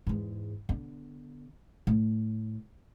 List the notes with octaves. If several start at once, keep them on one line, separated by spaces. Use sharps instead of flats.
E2 G#2
D3 B3
A2